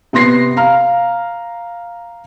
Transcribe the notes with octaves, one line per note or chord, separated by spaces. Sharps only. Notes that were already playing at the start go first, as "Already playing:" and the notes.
C3 B3 C6 A#6 C7
F5 A#5 F6